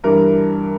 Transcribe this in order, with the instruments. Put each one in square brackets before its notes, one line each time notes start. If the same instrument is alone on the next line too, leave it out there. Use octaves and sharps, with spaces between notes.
[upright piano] G2 E3 G3 A#4